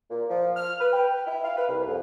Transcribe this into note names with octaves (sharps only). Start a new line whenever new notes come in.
A#2
F3
F6
B4
G5
E4
F5
B4
C2
F2